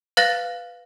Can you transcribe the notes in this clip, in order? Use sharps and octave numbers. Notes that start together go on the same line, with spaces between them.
B4 F5 F#6 A6 A#6